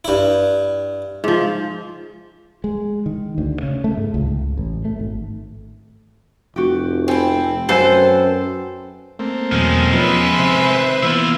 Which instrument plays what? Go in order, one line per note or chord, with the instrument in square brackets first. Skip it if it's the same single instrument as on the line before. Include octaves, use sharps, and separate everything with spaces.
[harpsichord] G2 E4
[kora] G#2 F3
[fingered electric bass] G#3
D#3
D2
C#3
A3
G#2
C#2
C#2
A1
A3
G#1
[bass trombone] F1 [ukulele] F#4 G4
[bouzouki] C4 E4 [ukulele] A4 C5 G#5
[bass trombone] F#2 [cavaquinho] A4 C5 [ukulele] B4 F#5 G#5
[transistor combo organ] A3 A#3 C4
[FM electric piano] E2 B2 F#3 [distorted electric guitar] D#3 G#3
[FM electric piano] F3 B3 C#4 [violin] B4 E5
[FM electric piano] C3 [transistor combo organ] C4 C5
[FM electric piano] E3 A#3 B3 [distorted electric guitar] E4 F4